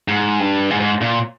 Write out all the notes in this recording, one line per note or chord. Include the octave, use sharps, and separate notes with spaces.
G#2
G2
G#2
G#2
A#2